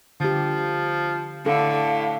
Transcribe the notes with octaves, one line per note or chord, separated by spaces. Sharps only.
D3 F3 G4
A2 D3 A4 F5